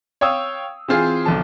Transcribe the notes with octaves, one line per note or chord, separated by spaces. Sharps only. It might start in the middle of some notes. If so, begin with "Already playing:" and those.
C#5 F5 G5 D#6 E6
E3 C4 F4 G#4 C5
B1 D3 F3 A5